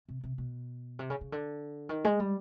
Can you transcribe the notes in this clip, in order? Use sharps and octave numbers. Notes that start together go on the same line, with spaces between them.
C3
C3
B2
C3
C#3
C#3
D3
D#3
G#3
G3